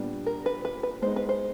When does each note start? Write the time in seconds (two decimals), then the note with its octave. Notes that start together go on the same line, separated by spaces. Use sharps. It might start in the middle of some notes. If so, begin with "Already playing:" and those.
Already playing: A#2 G3 B3 D4
0.26 A#4
0.46 B4
0.65 B4
0.83 B4
1.02 G#3 B3 D#4 C5
1.16 B4
1.29 C5